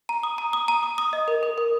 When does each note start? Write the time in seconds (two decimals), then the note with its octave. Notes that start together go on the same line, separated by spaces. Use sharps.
0.09 A#5
0.23 D#6
0.38 A#5
0.53 D#6
0.68 A#5
0.83 D#6
0.98 D#6
1.13 D#5
1.28 A#4
1.43 A#4
1.58 A#4